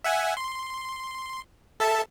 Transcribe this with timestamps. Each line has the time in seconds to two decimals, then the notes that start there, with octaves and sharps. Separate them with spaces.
0.04 E5 F#5 G#5
0.37 C6
1.80 A4 E5 A5